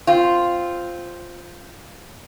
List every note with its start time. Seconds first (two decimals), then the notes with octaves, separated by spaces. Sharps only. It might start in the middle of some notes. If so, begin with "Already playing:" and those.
0.07 C4 F4